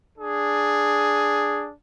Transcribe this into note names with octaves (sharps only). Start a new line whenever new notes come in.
D4 G#4